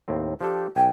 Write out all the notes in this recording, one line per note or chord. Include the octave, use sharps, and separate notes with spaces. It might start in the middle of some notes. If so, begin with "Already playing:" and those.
D#2 A2 C4
F3 D4 G4 A4
B1 G5 G#5